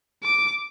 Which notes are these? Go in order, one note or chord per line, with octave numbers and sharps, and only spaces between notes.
D6